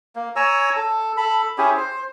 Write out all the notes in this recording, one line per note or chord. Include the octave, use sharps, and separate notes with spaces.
A#3
C#5 G#5 A#5 E6
A4
A4 B5
C#4 E4 G4 G#4
C5